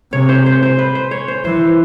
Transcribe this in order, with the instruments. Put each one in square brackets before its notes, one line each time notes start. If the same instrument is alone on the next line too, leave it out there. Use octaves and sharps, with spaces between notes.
[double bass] C3 [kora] C#5
[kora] C5
C5
C5
B4
C5
C#5
C5
[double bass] E3 [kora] C5